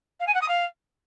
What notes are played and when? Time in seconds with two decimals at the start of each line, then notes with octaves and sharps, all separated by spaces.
0.20 F5
0.27 G#5
0.34 F#5
0.41 D#6
0.48 F5